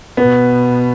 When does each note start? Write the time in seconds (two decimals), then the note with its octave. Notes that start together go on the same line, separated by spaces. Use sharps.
0.17 B2 B3